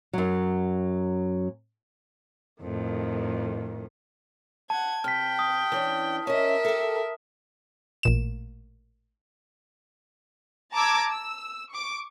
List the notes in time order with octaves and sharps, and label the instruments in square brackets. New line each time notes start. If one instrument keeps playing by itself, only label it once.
[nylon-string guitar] F#2 F#3
[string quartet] F2 A2 D#3
[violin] F#5 G#6 [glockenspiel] A5
[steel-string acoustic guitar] C3 [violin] G5 [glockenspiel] F6 B6
[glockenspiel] D#6
[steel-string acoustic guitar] E3 C#4 D4
[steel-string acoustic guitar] C#4 D#5 [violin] A#4 E5
[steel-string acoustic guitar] G4 A4
[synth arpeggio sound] A1 A#2 E7
[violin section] A5 A#5 D6 E6 G#6
E6
C#6 D6